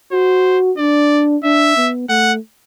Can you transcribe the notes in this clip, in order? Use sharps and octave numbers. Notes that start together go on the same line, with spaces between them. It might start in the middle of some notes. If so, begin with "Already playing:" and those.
F#4 C5
D4 D5
D4 E5
B3
A3 F#5